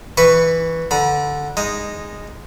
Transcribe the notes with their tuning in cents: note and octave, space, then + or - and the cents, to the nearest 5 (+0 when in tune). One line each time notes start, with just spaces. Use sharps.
E3 -5 B4 +0 C#6 +0
D3 +0 B5 -45
G#3 -10 D#4 +0